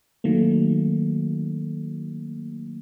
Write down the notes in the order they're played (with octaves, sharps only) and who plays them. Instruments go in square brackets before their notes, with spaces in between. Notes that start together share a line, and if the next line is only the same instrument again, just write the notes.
[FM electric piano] D#3 F#3 A3 A#3